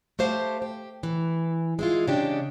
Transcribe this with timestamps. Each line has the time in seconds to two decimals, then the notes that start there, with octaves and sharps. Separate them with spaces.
0.19 A3 G4 C5 F5 F#5 A5
0.62 G4
1.03 E3
1.79 G#3 E4 F4
2.08 C#3 G#3 D4 G4